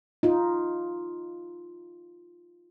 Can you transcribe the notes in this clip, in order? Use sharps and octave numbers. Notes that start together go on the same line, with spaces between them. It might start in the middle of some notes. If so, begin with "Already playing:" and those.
D#4 F4